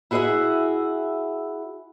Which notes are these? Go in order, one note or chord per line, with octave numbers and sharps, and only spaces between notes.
E4 F#4 G#4 C5 E5 F#5